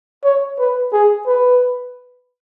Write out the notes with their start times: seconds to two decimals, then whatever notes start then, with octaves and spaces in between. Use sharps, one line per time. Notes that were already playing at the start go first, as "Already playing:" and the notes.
0.24 C#5
0.59 B4
0.93 G#4
1.27 B4